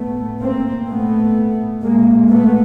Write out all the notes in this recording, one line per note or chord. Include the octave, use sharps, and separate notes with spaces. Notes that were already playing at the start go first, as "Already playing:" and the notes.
Already playing: A2 A3 B3
A#3 C4
A2 A3 B3
A#2 G#3 A#3
A3 B3